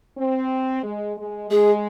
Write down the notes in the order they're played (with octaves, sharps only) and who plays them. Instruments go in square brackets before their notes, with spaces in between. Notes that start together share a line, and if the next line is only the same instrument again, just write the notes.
[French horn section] C4
G#3
G#3
[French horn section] G#3 [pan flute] G#4